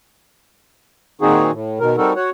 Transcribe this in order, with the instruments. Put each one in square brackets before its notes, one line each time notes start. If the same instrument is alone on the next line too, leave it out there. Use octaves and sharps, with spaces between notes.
[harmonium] A#2 D#3 C4 D#4 F#4 G#4
A2
B2 D#3 A#4
G3 C4 D#4 F#4 A4 A#4
F#4 C#5 F#5